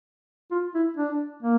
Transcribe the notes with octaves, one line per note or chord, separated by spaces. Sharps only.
F4
E4
D4
A#3